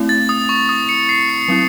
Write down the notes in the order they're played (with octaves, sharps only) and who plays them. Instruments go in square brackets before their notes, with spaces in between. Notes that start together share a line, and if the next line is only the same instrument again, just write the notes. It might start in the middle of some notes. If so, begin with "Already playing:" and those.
Already playing: [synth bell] A3 C4 E4
[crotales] A6
D#6
C#6
D#6
C#7
C7
C#7
[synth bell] F#3 C4 E4